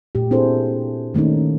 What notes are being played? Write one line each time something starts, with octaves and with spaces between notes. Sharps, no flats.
A#2 A3 G4
C4 D4 E4 G#4 A4 C5
D#3 A3 A#3 C#4 D#4